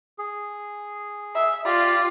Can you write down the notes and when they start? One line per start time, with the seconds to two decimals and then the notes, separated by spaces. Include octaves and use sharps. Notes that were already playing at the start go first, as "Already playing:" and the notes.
0.18 G#4
1.35 E5
1.65 F4 G4 D5